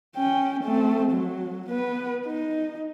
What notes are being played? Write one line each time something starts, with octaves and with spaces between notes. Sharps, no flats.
C#4 G5
A3 C4
F#3
B3 B4
D#4